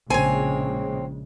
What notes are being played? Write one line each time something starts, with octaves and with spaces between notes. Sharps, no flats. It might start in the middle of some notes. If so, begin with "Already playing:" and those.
A#1 C#3 G#3 C4 C#5 G#5